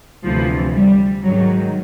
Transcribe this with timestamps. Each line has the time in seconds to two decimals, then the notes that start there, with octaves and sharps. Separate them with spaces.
0.24 D2 C3 E3 F3
0.74 G3
1.23 G#2 D#3 F#3